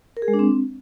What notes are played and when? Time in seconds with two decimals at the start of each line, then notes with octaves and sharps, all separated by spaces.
0.17 A#4
0.22 G#4
0.28 G#3
0.34 D4
0.39 C4